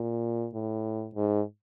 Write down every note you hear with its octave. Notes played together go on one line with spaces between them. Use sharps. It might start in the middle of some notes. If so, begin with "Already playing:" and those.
Already playing: A#2
A2
G#2